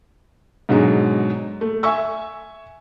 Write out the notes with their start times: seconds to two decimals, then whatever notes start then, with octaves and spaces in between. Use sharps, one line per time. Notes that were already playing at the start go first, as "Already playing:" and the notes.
0.69 G#2 B2 D3 F#3 G#3
1.61 A3
1.83 E5 G#5 C#6 E6